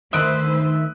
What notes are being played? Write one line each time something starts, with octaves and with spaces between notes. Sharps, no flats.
D2 D#3 B4 C5 E5 D#6 F#6 D7